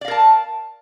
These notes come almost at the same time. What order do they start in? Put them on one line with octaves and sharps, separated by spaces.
D5 F5 A#4 A5